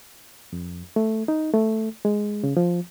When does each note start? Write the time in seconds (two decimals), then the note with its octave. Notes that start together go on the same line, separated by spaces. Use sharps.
0.53 F2
0.96 A3
1.28 D#4
1.53 A3
2.05 G#3
2.44 C#3
2.57 F3